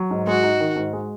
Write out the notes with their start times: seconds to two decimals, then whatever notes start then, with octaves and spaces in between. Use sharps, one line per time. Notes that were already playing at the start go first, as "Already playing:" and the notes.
Already playing: F#3
0.11 G#2
0.27 G#3 F#4
0.43 D#4
0.60 D#3
0.76 G#2
0.93 G#3